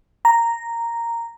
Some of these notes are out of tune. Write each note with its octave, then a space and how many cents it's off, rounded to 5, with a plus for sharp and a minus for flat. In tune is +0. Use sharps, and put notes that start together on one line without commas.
A#5 -5